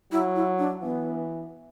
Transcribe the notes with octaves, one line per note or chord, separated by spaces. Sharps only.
F#3 E4
E4
D4
E3 B3